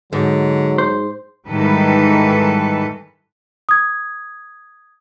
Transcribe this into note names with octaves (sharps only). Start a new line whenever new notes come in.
G#2 D3 F#3
C5
G#2 D#3 E3 G3 A4 B4
D#6 G#6